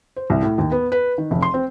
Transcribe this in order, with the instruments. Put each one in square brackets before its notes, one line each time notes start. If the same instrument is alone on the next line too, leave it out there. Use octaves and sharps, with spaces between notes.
[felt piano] C5
C2
A2
D#2
B3
B4
D#3
F1
C6
C4